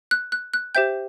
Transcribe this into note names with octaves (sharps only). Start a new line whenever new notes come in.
F#6
F#6
F#6
G4 C5 E5 G5 G6